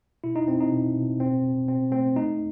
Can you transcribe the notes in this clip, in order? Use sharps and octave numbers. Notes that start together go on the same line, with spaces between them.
B2 E4
D#4
B2 C4
D#4
B2
B2
B2 C4
B2
B2 C4
A3 C4
A3 D#4